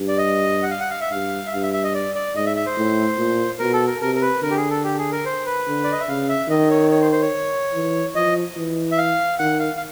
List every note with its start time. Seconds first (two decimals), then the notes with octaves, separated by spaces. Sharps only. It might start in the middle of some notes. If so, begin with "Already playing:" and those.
Already playing: G2
0.08 D5
0.18 D#5
0.63 F#5
0.71 F5
0.80 F#5
0.90 F5
1.01 E5
1.11 G2 F5
1.47 E5
1.53 G2 F5
1.63 E5
1.73 E5
1.84 D#5
1.94 D5
2.15 D5
2.35 G#2 D#5
2.46 E5
2.56 E5
2.66 C5
2.77 A2
3.18 A#2
3.59 B2 A#4
3.73 A4
3.87 A#4
4.01 C3 A#4
4.15 A#4
4.22 B4
4.42 D3 A#4
4.51 G4
4.57 G#4
4.70 A4
4.84 G4
4.98 G#4
5.12 A#4
5.25 C5
5.46 B4
5.67 D3
5.84 D5
5.92 D#5
6.00 E5
6.08 C#3 F5
6.29 E5
6.49 D#3 D#5
6.70 C#5
6.91 C#5
7.01 C5
7.12 C5
7.22 C#5
7.74 E3
8.15 F3 D#5
8.56 E3
8.92 E5
8.98 F5
9.39 D#3 F#5
9.60 F5
9.77 F5